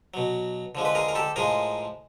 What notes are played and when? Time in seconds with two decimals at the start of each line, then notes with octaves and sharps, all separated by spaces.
0.14 B2 F#3
0.75 D3 F3 G#3
0.85 B4
0.95 G#4 A#4
1.08 A#4
1.15 G4 A4
1.36 A2 F3 G#3 G#4 A#4